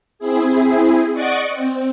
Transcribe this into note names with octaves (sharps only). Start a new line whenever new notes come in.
C4 E4 G#4
D5 D#5 F#5 C#6 D6
C4